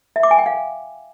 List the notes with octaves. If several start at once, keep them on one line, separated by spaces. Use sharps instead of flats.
E5
D6
G#5
G5
F5